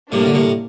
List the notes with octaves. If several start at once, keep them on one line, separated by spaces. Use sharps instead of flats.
A2 C3 G3 A#3 D4
D3
A2 C3